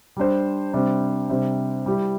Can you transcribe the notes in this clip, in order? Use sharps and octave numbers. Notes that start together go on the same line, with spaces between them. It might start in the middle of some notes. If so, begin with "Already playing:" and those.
G3 D4 C5
C3 G3 D4 C5
C3 G3 D4 C5
G3 E4 G4